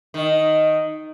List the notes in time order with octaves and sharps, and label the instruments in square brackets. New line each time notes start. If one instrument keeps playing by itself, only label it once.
[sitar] D#3